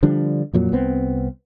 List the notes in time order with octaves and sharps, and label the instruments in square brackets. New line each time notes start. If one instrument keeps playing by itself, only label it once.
[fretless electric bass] D3 F3 G3 D4
F2 A#2 F#3
C2 B3 C4